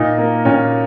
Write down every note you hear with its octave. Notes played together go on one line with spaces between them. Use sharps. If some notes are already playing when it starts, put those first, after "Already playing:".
Already playing: A#2 D#4
A#3
A#2 C#4